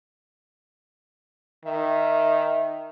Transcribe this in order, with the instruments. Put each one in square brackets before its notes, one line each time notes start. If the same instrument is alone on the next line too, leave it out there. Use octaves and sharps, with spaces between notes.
[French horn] D#3 [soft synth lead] E5